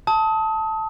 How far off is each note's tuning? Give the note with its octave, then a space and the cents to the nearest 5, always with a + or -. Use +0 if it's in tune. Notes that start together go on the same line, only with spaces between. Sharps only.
A5 +0 D#6 +30